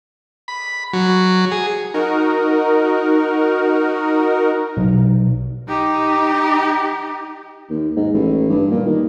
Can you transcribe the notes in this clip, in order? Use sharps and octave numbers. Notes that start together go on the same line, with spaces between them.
B5
F#3
G#4
D#4 F#4 A#4
B1
D#4 G4
D#2
G#2
A1
G2
A#2
D#3